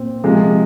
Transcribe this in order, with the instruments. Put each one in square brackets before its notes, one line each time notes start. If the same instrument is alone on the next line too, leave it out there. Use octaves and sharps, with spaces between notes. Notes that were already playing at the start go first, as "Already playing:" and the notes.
Already playing: [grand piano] A#2 C4
C3 F3 G#3